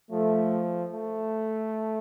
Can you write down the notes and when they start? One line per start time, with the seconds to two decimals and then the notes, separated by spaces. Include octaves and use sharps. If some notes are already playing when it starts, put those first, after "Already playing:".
0.11 F3 A3
0.92 A3